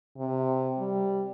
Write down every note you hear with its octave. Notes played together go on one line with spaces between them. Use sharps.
C3
G3